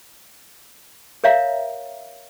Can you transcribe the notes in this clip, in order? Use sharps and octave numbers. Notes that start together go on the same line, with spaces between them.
A#4 C#5 E5 F5 A#5